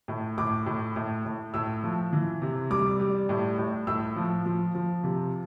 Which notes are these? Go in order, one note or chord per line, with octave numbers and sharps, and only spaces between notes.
A2
A2 D6
A2
A2
A2
A2 E6
F3
E3
C3
G3 D6
G3
A2
A2
A2 E6
F3
F3
F3
C3